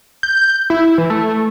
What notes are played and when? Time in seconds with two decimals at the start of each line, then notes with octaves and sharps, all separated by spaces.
0.23 G6
0.70 E4
0.98 E3
1.10 A3